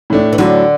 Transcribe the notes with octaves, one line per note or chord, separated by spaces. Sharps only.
A2 A3 D4
E3
A2 D3 F#3 D4